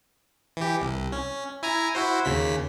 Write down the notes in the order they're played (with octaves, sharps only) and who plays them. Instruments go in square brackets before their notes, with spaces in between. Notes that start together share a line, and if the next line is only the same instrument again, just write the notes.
[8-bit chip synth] E3 G4
C2
C#4
E4 G#5 A#5
E4 F#4 C5
D#2 C#3 B6